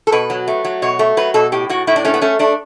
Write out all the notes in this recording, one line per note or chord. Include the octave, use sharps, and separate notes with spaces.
A4
B2 B4
F#3
A3
F#3
B2 C#5
A3
F#3 B4
B2 A4
A2 G4
A2 F#4
A2 E4
D4
A3 C#4
B3
A3 C#4
A3 D4